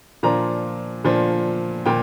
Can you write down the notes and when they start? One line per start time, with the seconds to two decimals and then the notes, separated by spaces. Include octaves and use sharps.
0.23 A#2 F3 D4 A#5
1.04 A#2 F3 D4
1.86 A#2 G5